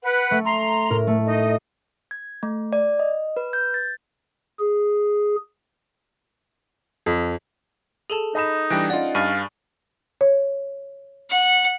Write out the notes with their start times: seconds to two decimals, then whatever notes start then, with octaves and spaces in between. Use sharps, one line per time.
0.03 B4 F#5
0.31 A3
0.45 A#5 C6
0.90 A2 A#4
1.07 A3
1.25 D#4 D#5
2.11 G#6
2.43 A3
2.73 D5
2.99 D#5
3.37 B4
3.53 G6
3.74 A6
4.59 G#4
7.06 F2
8.10 G#4 A4 A5 D#7
8.35 D#4 D#5 B5 E7
8.70 E3 G3 D4 G5 F#6 A#6 D7
8.90 C#4 D#4 F4 D5 F#5
9.15 G2 F5 G#5 C#6 A6
10.21 C#5
11.30 F#5